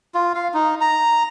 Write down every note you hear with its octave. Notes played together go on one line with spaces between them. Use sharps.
F4
F5
D#4
A#5